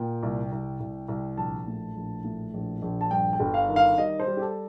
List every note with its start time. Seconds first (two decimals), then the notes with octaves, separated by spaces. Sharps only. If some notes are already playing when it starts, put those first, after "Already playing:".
Already playing: A#2 G5
0.23 C2
0.52 C2
0.80 C2
1.08 C2
1.37 A#1 A5
1.67 A2
1.96 A#1
2.24 A2
2.54 A#1
2.82 A#1
3.01 A5
3.11 G2 G5
3.33 G5
3.40 G1
3.54 F5
3.69 D#3
3.76 F5
3.98 G3 D#5
4.20 C5
4.27 G3
4.37 G4
4.41 A4